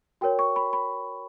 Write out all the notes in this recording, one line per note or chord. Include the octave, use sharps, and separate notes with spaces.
F#4 A#4 C#5 G5
C#6
B5
B5